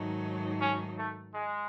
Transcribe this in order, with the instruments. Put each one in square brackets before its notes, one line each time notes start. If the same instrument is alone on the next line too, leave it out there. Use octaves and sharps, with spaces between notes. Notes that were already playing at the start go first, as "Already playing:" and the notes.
Already playing: [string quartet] G#2 D#3 F#3 A3 D#4
[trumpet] C#4
A3
G#3